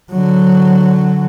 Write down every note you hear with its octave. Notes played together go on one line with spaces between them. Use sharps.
D3 F#3